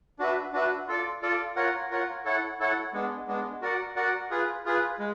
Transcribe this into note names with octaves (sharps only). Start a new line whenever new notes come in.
D4 F#4 B4 E5
D4 F#4 B4 E5
F4 A4 D5
F4 A4 D5
F4 A#4 C#5 F#5
F4 A#4 C#5 F#5
E4 A4 C#5 F#5
E4 A4 C#5 F#5
G#3 B3 D4
G#3 B3 D4
F#4 A#4 D5 F#5
F#4 A#4 D5 F#5
F4 G#4 B4
F4 G#4 B4
G#3